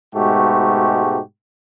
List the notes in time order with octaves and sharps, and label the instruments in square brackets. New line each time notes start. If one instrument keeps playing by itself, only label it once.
[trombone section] G#2 B2 G#3 A3 F#4 G4